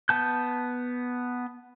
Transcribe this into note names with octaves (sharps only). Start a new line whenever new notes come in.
B3 A5 G6